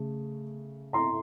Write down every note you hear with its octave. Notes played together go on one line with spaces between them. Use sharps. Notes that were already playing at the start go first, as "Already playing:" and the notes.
Already playing: C#3 A3
A#5 C6